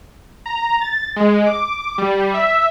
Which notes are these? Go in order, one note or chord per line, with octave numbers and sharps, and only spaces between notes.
A#5
A6
G#3
D6
G3
E5